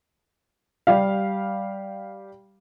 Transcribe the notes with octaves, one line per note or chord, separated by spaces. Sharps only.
G3 G4 F5